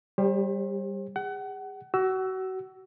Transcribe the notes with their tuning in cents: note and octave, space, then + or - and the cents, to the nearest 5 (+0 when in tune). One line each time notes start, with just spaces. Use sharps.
G3 +0 G4 +35 C5 +40
G#4 -40 F#5 +30
F#4 +30 E6 +0